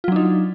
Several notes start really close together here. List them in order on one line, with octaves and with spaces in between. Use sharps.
F4 F#3 D4 D#4